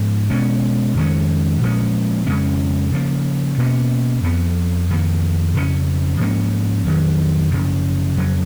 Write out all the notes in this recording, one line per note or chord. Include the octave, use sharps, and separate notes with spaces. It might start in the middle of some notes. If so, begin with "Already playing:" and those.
Already playing: G#2 F3 B3
B2 G#3 C#4
F2 D#3 G#3 C#4
A#2 F3 G#3 C#4
F2 C#3 G#3 C#4
C#3 F3 A#3
B2 A#3 C#4
F2 F3 B3
F2 D#3 A#3
F2 C#3 G#3 C#4
G#2 F3 A#3 C#4
F2 D#3 F#3
F#2 C#3 F3
F2 C#3 F#3